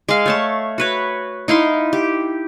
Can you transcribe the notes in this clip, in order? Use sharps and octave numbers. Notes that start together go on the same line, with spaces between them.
G#3 F5
A3 C#5 A5
F#4 B4 C#5
D#4 E4 F5 C6
G4